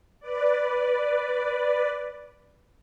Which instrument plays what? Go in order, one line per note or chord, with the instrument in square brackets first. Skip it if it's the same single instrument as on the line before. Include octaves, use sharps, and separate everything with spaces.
[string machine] B4 D5